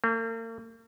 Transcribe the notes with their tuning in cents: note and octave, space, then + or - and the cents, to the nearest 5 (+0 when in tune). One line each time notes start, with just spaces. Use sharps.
A#3 -45